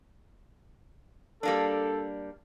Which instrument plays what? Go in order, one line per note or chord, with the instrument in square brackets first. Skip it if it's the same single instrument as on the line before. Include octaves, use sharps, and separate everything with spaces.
[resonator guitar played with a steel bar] G3 A#3 D4 [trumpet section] A4